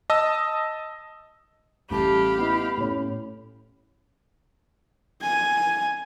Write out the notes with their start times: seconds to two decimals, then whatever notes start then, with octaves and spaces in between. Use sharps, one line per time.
0.10 D#5 A5 D#6 E6
1.90 A1 G3 G4 F5 A5 B5
2.38 B3 E4 D#5
2.77 A2 C#4
5.22 G#5